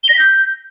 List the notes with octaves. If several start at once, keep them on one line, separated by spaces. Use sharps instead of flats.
G7
A#6
B6
G6